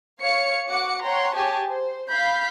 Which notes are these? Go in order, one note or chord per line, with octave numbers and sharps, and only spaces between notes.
C#5 F5 C#7
F#4 F#5 D6 C#7
C#5 F#5 G5 A#5 C6
G4 G#4 C#5 G#5 A5
C5
F5 B5 G6 B6